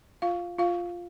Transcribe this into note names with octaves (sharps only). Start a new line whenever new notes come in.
F4 F5
F4 F5